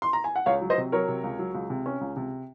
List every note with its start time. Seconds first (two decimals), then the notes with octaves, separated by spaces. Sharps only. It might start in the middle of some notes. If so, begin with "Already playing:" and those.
0.02 C6
0.13 A#5
0.24 G#5
0.36 F#5
0.46 C#2 C#5 F5
0.62 F#3
0.70 C5 D#5
0.78 C3
0.92 F#3 A#4 C#5
1.08 C3
1.24 C#2
1.39 F#3
1.55 C#2
1.70 C3
1.86 C#4
2.01 C#2
2.16 C3